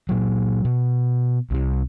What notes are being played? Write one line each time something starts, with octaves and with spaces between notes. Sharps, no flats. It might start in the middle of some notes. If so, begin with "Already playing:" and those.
A#2 F#3
B2
C2 C3